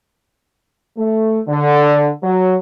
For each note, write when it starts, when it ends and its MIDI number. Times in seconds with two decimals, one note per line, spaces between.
0.98 1.41 57
1.47 2.09 50
2.23 2.56 54